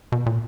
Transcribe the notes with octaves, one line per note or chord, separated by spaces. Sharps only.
B2
A#2